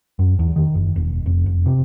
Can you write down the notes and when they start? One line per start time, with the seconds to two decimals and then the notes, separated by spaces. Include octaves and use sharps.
0.19 F#2
0.39 E2
0.56 D#3
0.74 F#1
0.96 E1
1.26 F1
1.46 F1
1.66 C3